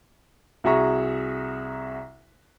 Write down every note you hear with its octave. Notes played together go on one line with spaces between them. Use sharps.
C2 F#4 G#4 E5 A#5 C#6